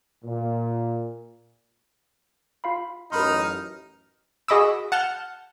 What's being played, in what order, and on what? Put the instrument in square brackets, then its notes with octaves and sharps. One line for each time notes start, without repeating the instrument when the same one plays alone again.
[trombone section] A#2
[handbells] F4 F5 B5
[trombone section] A1 F#2 [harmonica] D#4 [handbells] A#4 B5 C6 [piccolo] F6
[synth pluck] F#4 G#4 D#5 B5 D6 E6
F#5 A5 F6 G6